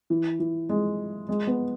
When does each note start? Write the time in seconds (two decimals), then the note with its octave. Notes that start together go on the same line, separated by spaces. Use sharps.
0.10 E3
0.40 E3
0.69 G#3
1.29 G#3
1.47 B3